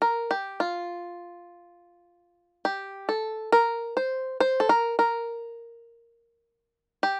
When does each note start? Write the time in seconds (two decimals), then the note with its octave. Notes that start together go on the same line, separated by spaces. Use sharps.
0.02 A#4
0.31 G4
0.60 F4
2.65 G4
3.09 A4
3.52 A#4
3.97 C5
4.40 C5
4.60 A4
4.69 A#4
4.99 A#4
7.03 G4